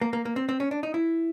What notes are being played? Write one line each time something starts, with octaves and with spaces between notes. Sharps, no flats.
A#3
A#3
A#3
C4
C4
C#4
D4
D#4
E4